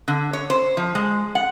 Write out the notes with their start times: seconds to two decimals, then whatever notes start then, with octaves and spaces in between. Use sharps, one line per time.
0.08 D3
0.33 C#5
0.50 C5
0.77 F3
0.95 G#3
1.35 F#5